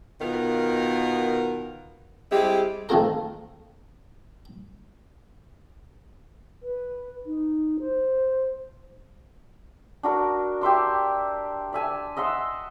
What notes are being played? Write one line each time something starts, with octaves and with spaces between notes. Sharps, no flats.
B2 D#3 B3 F4 A#4
G3 G#3 C4 E4 G4
D#3 A3 C4 F4 G#4 A#4
B4
D#4
C5
D4 F#4 A#4
G4 E5 C6 D6
D5 E5 G#5 A5
D#5 E5 F#5 C6